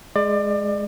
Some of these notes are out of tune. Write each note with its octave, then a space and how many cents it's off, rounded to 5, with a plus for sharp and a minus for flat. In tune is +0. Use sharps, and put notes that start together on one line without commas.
G#3 +5 D5 +30